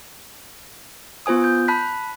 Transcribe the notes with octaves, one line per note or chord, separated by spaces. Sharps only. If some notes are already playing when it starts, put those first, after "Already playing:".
B3 F4 C5 G#5 D#6
G6
A5 B5 F#6 B6